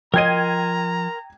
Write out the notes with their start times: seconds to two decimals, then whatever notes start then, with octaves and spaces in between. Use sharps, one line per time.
0.14 F3 A#4 D#5 G5 A#5 C6 G#6 D#7